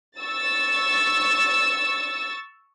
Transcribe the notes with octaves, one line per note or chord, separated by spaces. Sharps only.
C#6 E6 A6